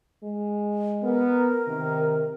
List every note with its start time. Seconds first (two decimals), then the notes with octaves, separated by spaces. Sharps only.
0.24 G#3
1.02 B3 A#4
1.68 C3 D#3